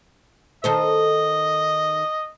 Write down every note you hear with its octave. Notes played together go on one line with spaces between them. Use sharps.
D#3 A4 C5 D#5